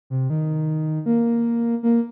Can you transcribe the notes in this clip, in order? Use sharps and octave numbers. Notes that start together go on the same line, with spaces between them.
C3
D#3
A#3
A#3